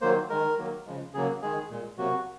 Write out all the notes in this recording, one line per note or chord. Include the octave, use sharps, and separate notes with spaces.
D#3 F#3 A#3 C5
D#3 G#3 A#4
D#3 F#3 A#3
C#3 F3 G#3
C#3 F#3 A#3 G#4
D#3 G#3 G#4
A#2 G#3
C3 F#3 A#3 F#4